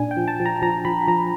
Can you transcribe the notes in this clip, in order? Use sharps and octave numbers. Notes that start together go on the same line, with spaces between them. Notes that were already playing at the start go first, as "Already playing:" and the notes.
Already playing: A#2 D4 G#5
G5
F3
A5
F3
A#5
F3 A#5
F3 B5
F3 A#5